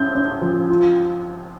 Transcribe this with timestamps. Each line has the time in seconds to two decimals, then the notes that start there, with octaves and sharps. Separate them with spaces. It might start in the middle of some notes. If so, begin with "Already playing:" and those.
Already playing: C#4 E4 G6
0.15 C#4
0.41 F3
0.69 F4